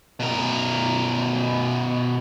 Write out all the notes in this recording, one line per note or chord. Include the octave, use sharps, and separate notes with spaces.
B2 A#4